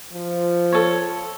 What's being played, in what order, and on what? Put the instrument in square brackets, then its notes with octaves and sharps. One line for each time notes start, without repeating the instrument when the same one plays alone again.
[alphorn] F3
[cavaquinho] A4 C#5